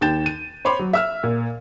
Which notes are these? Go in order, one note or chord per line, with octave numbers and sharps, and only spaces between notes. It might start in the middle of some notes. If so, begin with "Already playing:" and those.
D#2 G5 G6 A6 E7
D#7
C5 C#5 B5 C6 D6
F#3
E5 E6 F6
A#2